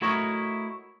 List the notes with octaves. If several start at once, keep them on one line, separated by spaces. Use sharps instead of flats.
A3 E4 F#4 A#4 C#5 D#5